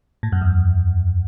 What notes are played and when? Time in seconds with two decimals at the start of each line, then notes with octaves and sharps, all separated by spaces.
0.23 A2
0.32 F#2
0.41 E2